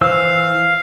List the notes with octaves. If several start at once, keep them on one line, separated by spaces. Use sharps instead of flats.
E3 C5 F5 E6